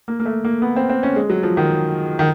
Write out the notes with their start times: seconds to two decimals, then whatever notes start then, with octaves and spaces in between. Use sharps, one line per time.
0.08 A#3
0.20 A#3
0.26 A3
0.45 A#3
0.62 B3
0.76 C4
0.89 C4
1.03 C#4
1.16 G#3
1.30 F#3
1.43 F3
1.57 D#3
2.19 D#3